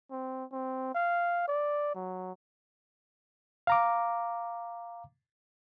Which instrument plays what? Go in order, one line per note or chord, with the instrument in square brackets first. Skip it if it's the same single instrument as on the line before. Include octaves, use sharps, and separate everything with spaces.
[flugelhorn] C4
C4
F5
D5
F#3
[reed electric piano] F5 A#5 D6